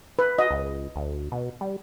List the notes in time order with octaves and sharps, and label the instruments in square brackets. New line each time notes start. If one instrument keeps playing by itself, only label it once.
[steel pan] B4
[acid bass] F#4 [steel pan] D#5
[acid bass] C#2
D2
B2
G3